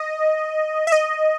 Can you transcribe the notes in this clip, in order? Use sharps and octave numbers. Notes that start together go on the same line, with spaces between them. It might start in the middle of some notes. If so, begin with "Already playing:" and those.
Already playing: D#5
E5
D#5